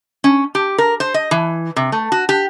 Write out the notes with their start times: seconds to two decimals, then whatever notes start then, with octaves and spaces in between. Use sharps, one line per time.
0.24 C#4
0.55 G4
0.78 A#4
1.00 C5
1.14 D#5
1.31 E3
1.76 C3
1.92 A3
2.12 F#4
2.29 G4